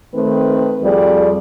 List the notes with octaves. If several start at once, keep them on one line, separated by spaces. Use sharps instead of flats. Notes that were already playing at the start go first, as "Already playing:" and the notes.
D#3 A3 C4 B4
F2 G3 G#4 D5